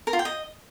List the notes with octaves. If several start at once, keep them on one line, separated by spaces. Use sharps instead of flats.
A#4
F4
G5
D#5